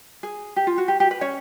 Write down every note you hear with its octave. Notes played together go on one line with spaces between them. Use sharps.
G#4
G4
F4
F#4
G4
G4
B4
C#4 C#5